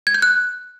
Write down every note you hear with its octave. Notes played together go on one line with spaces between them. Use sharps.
G#6
G6
F#6